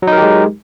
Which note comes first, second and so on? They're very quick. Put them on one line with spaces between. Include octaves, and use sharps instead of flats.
F#3 D#4 A#4 G4 G#3